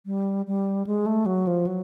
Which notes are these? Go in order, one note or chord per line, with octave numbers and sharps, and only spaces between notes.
G3
G3
G#3
A3
F#3
F3
F#3